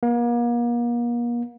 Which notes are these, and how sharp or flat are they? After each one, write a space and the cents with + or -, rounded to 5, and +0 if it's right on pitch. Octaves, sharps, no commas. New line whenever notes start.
A#3 +40